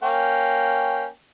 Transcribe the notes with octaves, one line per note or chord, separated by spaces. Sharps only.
A#3 C#4 G5